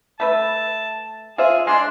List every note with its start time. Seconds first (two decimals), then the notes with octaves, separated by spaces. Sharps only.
0.20 A3 B4 E5 A5
1.38 F4 G#4 C5 E5
1.67 G#3 D4 C6